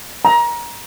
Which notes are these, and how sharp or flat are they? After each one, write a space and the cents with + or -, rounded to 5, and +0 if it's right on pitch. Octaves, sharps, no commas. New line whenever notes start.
A#5 +25